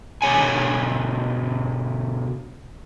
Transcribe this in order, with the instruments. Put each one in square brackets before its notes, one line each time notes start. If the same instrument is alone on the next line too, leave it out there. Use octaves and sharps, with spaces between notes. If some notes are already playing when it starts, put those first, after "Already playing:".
[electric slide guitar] B2 D3 G4 C#5 F#5 G#5